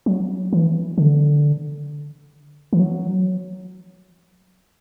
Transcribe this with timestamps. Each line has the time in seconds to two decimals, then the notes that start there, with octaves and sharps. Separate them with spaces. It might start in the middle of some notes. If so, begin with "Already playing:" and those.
0.06 F#3
0.53 E3
0.98 D3
2.73 E3
2.80 F#3